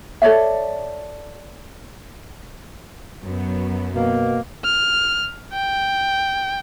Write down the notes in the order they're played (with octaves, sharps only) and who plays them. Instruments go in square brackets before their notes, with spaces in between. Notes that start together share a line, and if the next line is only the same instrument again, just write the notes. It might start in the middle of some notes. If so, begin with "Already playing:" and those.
[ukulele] A4 C#5 D5 E5
[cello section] F#2 F#3 B3
[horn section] B2 A#3
[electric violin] F6
G5